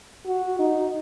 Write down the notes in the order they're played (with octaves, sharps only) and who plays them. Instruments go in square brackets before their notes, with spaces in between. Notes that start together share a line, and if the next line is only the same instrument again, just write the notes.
[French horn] F#4
D#4